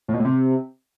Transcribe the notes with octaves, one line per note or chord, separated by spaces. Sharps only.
A2
B2
A2
C3